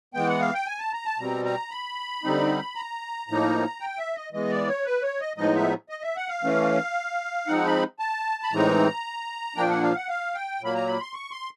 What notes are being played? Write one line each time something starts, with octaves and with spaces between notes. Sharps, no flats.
E3 G#3 B3 G5
F#5
F5
G5
G#5
A5
A#5
A5
B2 G3 C4 A#5
A#5
B5
D3 G3 C4 D#4
A#5
A2 F3 A#3 D#4
G5
E5
D#5
E3 G#3 B3 D#5
D5
C#5
B4
C#5
D#5
A2 F3 G#3 B3 D#4 D#5
E5
D#5
E5
F#5
F5
E3 A3 C#4
F3 G#3 C4 D#4 F#5
B5
A5
B5
A2 E3 G#3 C4 D#4 A#5
A#2 F3 A#3 D4 G5
F#5
F5
F#5
F5
G5
A#2 F#3 A#3 B5
A#5
B5
C6
C#6
C6